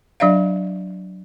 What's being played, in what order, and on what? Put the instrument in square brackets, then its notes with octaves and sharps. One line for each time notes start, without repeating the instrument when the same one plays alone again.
[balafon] F#3 D4 D5 E5 F5